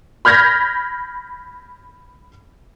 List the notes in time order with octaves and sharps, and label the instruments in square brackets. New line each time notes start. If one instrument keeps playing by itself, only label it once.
[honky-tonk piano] B5 F6 G6 G#6 A#6 B6